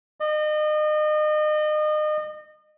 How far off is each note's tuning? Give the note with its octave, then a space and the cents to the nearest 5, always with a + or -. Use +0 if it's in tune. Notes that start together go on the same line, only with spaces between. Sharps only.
D#5 -35